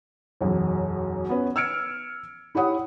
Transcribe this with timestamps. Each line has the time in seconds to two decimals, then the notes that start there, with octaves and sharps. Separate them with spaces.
0.41 E1 B1 F#2
1.29 B3 C#4 B4
1.56 E6 F6 G#6 C#7 D7
2.55 E4 G4 C#5 F#5 D#6